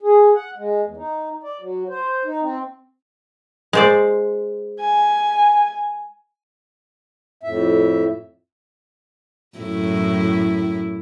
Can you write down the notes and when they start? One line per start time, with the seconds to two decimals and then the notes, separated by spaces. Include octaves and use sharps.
0.01 G#4
0.35 F#5
0.57 G#3
0.84 E2
0.97 D#4
1.43 D5
1.61 F#3
1.89 C5
2.25 D#4
2.42 C4
3.73 G#3 C5 D5
4.80 G#5
7.43 F2 A2 E5
9.58 F#2 A2 E4